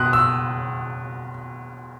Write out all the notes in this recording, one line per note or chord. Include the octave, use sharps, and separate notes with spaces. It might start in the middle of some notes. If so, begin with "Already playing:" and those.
Already playing: B2 D#6 F#6
E6